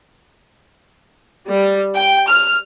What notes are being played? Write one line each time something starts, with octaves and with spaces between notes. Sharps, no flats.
G3
G5
F6